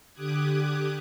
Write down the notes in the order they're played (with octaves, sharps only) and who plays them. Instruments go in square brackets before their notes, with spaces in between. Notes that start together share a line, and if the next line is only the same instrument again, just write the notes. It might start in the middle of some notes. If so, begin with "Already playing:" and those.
[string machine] D3 G4 D6 D#6 F#6 G#6